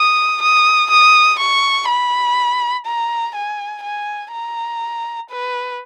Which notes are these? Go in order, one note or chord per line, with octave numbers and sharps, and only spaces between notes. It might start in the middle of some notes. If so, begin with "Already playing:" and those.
Already playing: D#6
D#6
D#6
C#6
B5
A#5
G#5
G#5
A#5
B4